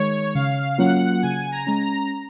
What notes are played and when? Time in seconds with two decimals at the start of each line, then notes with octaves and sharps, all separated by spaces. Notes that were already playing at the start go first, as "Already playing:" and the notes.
Already playing: D#3 G#3 C#5
0.35 C#3 F5
0.78 F#3 A#3 C#4 F4 F#5
1.23 C#3 G#5
1.52 A#5
1.67 G#3 C#4
1.80 A#5